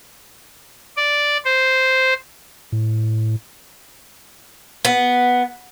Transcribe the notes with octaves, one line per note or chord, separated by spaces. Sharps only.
D5
C5
A2
B3